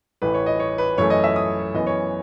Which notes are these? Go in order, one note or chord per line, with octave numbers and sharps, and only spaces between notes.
A1 A2 E3 B4
C#5
D#5
C#5
B4
F#2 E3 A3 C#5
D#5
E5
D#6
F#2 E3 B3 D#5
C#5